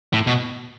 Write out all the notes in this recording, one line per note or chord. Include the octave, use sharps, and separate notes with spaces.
A2
B2